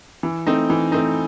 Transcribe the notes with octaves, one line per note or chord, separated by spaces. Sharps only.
E3
A3 C4 D#4
E3
A3 C4 D#4